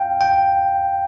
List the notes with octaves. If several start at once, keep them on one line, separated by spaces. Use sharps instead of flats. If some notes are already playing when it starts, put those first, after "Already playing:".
Already playing: F5 G5
G5